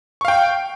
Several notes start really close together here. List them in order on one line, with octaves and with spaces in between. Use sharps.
C#6 F5 G5